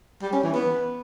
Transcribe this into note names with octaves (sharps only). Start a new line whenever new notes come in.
G3
C#4
E3
B3